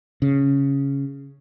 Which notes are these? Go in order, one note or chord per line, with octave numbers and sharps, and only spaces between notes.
C#3